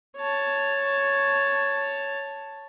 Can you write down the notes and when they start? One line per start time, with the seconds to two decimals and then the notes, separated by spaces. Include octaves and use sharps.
0.17 C#5 A5